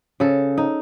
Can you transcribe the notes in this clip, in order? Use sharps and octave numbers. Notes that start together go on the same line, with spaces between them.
C#3 A4
D#4